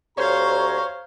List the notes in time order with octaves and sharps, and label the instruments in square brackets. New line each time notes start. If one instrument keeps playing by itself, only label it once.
[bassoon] D2 [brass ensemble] G4 A#5 [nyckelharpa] C5 F5 [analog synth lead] C#5